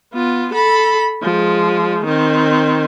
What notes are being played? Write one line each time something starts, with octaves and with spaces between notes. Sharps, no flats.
B3 F4
A4 B5
F3 G#3
D#3 C4